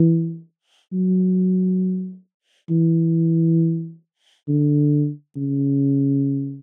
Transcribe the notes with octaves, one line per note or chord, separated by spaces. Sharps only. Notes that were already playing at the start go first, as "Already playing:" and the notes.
Already playing: E3
F#3
E3
D3
C#3